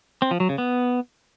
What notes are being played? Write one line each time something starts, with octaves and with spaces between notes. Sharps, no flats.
C4
F3
F#3
C#3
B3